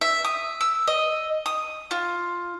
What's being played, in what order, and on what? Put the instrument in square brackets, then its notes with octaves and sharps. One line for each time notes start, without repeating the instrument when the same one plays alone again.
[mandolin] E5
D#6
E6
D#5
D#6
F4